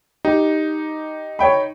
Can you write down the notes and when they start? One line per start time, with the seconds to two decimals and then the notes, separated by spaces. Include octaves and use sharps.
0.25 D#4 G4
1.39 C#5 G5 B5